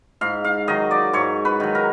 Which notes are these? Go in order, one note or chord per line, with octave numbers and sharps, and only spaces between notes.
G#2 F5
F5
D#3 F#3 D#5
D5
G#2 C#5
B4
D#3 F#3
A#4